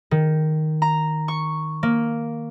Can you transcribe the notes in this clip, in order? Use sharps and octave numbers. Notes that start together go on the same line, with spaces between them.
D#3
A#5
C#6
A#3